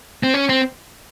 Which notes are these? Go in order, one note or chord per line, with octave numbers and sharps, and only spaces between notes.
C4
C#4
C4